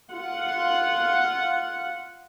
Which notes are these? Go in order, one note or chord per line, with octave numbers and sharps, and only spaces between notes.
F4 F#5